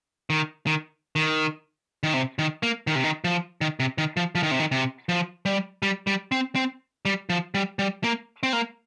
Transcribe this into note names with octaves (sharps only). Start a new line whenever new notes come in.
D#3
D#3
D#3
D#3
C3
D#3
A#3
D#3
C3
D#3
F3
D#3
C3
D#3
F3
F3
D#3
C3
D#3
C3
F3
G3
G3
G3
C4
C4
G3
F3
G3
G3
A#3
C4
A#3